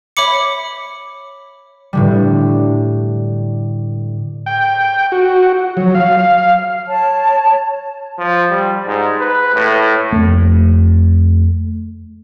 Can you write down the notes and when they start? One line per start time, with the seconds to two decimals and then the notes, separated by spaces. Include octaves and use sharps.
0.17 C#5 E5 B5 D6 C#7
1.93 A2 D3 G3
4.46 G5
5.12 F#4
5.77 F#3
5.95 F5
6.88 C#5 A5
8.18 F3
8.51 G3
8.87 G#2
9.20 B4
9.54 A2
10.12 F2 A3